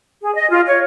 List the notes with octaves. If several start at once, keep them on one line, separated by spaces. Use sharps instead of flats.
G#4
D#5
F4
C#5